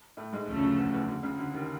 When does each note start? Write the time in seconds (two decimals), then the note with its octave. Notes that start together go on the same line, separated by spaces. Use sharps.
0.17 A2 A3
0.33 G#2 G#3
0.48 D2 C#3 F3 A3
0.63 F#2 F#3
0.78 E2 E3
0.93 E2 E3
1.08 D2 D3
1.23 C#2 C#3
1.38 D2 D3
1.54 D#2 D#3